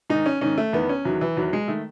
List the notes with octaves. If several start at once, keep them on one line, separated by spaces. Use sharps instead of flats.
G#2 D#3 D#4
C#4
G#2 D#3 C#4
A3
E2 D#3 B3
C#4
E2 D#3 F#3
E3
E2 D#3 F#3
G#3
D#3 A3